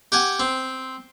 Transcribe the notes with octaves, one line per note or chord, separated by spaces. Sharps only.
G4 F#5 G#5
C4